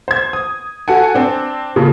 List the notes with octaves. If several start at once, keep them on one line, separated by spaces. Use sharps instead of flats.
C5 G#6
D#6
F#4 A4 F#5 G#5
C4 D4
C#3 A#3 F4 A4